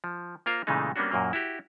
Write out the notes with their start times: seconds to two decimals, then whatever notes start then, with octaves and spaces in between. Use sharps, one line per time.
0.04 F3
0.46 A#3 F4 A#4 C5
0.67 A#2 C#3 E3 G#3 A3 D#4
0.96 G3 A#3 B3 C#4 D4 F#4
1.11 F#2 A#2 F#3 A#3
1.33 E4 F#4 G4